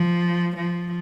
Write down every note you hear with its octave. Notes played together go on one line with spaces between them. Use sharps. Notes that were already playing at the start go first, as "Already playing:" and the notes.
Already playing: F3
F3